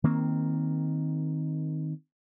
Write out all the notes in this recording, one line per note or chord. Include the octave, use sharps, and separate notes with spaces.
D#3 A#3 C4